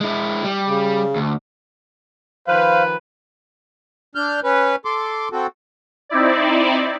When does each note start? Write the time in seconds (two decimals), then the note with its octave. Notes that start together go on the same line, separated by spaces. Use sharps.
0.01 G#3 E4
0.44 G3
0.67 C#3
1.16 D2
2.47 D#3 F3 B4 C5 F5
4.15 D4 F6 G6
4.44 C#4 B4
4.85 A4 C6 D6
5.32 C4 F#4 A4
6.09 C4 D#4 E4 D5